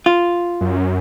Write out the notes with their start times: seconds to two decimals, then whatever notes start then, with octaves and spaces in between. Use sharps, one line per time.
0.06 F4
0.61 F#2